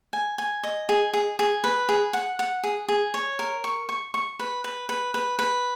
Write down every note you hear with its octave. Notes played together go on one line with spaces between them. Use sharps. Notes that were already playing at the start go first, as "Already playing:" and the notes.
G#5
G#5
D#5
G#4
G#4
G#4
B4
G#4
F#5
F#5
G#4
G#4
C#5
A#4
C#6
C#6
C#6
B4
B4
B4
B4
B4